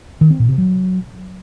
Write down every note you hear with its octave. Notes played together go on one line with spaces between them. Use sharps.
D#3
C4
A#2
C3
F#3